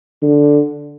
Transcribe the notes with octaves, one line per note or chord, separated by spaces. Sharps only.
D3